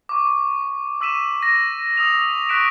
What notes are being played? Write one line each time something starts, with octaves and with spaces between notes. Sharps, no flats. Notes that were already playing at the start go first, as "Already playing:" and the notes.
C#6 D6
C#6 E6 B6 D#7 E7
A#6
D#6 E6 F7
C#6 F#6 B6 D7 E7